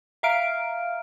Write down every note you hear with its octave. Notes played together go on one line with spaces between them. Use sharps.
E5 F5 A#5 F6 D7